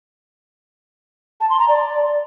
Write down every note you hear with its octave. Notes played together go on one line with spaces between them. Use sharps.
A5
C6
A#5
D5